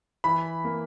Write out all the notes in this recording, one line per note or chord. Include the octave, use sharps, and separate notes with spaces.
E3 B5
A#3